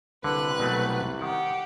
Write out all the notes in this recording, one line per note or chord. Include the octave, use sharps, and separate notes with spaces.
C2 D3 B4 F#6
B2 F#3 A3
D#3 G4 F#5